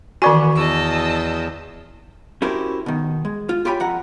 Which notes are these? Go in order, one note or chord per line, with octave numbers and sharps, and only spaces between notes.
D#3 E3 B3 F#4 D5 G#5 C#6 D6
E2 D#5 A5 E6
C#4 E4 F#4 G4 A#4 C5
B2 D#3
G#3
F4
F4 G4 C#5 G5 G#5 B5
F2 F#5 A#5